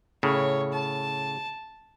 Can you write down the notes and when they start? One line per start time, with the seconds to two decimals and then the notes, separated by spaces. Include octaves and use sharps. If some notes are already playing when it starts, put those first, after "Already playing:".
0.23 A2 C#3 C#5
0.73 A5